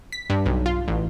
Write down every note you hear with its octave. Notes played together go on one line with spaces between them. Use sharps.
B6
G2
B1
F4
A1